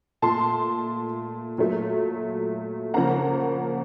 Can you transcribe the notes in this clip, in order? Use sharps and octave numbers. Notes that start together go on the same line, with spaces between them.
A#2 A3 A5 C6
A#2 F#3 A3
C#3 F3 A#3 F#5 A#5